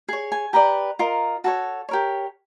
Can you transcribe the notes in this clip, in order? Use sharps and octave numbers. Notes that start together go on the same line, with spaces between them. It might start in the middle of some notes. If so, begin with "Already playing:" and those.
G#4 C#5
G#5
G4 B4 D5 A#5
F4 A#4 D#5
F#4 A4 C#5 A5
G4 A#4 C#5